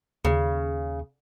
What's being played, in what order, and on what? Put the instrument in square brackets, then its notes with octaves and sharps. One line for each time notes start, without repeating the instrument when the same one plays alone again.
[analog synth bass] D#2 [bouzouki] C#3